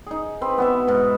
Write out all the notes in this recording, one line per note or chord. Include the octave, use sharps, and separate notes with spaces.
D#4 G#4
C4 B4
B3 F#4 E5
G#2 B2